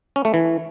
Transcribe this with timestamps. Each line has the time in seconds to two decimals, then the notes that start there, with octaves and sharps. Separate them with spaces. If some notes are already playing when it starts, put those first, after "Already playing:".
0.16 C#4
0.25 A3
0.34 E3